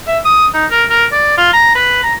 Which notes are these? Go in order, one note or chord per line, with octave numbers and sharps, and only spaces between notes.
E5
D#6
D#4
A#4
A#4
D5
F4
A#5
B4
A#5